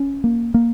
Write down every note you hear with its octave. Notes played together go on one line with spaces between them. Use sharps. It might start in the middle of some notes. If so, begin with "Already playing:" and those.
Already playing: C#4
A#3
A#3